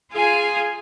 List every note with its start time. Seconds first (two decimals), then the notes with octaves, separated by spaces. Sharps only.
0.12 F4 G#4 F5 G#5